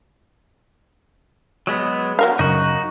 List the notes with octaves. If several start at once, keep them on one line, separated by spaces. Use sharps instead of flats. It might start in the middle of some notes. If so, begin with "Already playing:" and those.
F#3 G#3 B3
F#3 A#4 F5
F#2 C#3 D#4 F#4